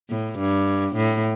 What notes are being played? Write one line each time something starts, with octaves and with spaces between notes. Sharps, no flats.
A2
G2
A2